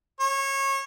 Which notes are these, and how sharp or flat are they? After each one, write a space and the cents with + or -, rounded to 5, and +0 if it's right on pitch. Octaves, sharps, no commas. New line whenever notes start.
C#5 -25